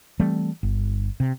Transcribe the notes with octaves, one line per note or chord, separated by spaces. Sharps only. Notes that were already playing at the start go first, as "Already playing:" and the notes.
E3 G3 A3 C4
G1
C3